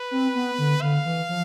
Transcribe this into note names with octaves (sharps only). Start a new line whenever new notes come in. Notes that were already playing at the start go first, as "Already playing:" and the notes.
Already playing: B4
C4
B3
D3
D3 F5
E3
F3